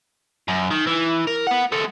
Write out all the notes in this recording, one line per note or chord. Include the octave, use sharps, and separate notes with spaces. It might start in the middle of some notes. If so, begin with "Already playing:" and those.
F#2
D#3
E3
A#4
B3 F#5
G#3 A4